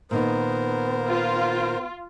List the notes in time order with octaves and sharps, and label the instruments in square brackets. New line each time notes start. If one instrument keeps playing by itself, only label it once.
[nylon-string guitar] A#2 D#3 D#4 [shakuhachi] B3 [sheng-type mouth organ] A#4 C5
[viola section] F4